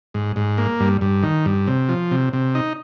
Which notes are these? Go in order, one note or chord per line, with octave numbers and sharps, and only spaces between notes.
G#2
G#2
A#3
G2
G2
D#3
G2
C3
F3
C3
C3
D#4